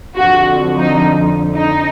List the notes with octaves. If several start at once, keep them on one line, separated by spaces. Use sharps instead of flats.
F2 D3 F3 F#4
D#4
D#4